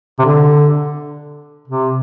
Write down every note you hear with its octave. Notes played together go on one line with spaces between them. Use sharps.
C3
D3
C3